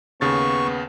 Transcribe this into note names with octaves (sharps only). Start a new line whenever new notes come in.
D#2 C#3 B3 C#6 A6